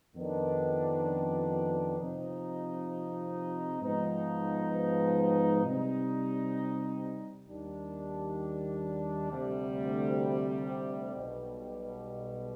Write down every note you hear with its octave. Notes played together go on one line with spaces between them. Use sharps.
F2 D#3 B3 D4
C3 F3 C4 D#4
G#2 F3 B3 D#4
C3 G3 C4 D#4
D#2 D#3 G3 D4
D2 C3 G3
B1 B2 G3